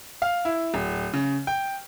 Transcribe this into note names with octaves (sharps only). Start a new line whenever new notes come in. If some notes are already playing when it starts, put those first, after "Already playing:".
F5
E4
D1
C#3
G5